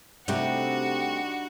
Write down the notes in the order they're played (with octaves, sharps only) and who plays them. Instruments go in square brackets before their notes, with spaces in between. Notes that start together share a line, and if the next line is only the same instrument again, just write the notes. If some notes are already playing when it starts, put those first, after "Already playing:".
[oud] C3 A3 [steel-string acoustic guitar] G3 D4 D#4 [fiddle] F#4